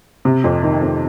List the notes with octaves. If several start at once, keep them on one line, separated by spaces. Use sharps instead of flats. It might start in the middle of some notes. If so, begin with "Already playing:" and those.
C3
F2
D#3
F2